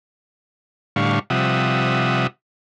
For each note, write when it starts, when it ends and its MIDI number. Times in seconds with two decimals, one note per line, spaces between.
0.96 1.19 45
0.96 1.19 50
0.96 1.19 55
0.96 1.19 77
0.96 1.19 85
1.30 2.27 48
1.30 2.27 53
1.30 2.27 55
1.30 2.27 76
1.30 2.27 78
1.30 2.27 87